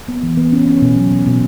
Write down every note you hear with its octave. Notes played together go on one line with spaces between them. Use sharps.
B3
E3
B3
C#4
C#4
B2
F#3
B2
B2